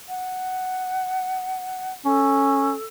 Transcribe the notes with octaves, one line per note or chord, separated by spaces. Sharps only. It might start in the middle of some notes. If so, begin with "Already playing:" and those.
F#5
C#4 A4